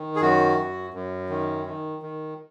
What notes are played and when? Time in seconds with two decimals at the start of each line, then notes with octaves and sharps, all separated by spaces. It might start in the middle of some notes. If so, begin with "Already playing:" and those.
Already playing: D#3
0.16 G#4
0.21 F#2 F#4
0.58 F#2
0.94 F#2
1.30 D#3
1.66 D#3
2.02 D#3